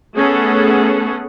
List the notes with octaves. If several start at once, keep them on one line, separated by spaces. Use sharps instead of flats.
A3 B3 C#4 G#4 A4 F#5